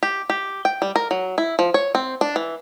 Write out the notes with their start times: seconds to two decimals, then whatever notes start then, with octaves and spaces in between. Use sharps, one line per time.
0.03 G4
0.30 G4
0.65 G5
0.82 G3
0.96 A#4
1.11 F#3
1.38 E4
1.59 F3
1.74 C#5
1.95 C4
2.21 D4
2.36 E3